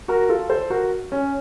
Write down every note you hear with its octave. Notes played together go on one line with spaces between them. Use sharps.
F#4 A#4
F4 A4
A4 C5
F#4 A#4
C#4